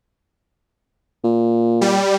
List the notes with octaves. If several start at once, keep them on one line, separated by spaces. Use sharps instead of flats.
A#2
G3